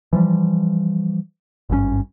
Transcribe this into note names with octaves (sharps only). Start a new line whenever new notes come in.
E3 F3 G3
G#1 G2 D3 C#4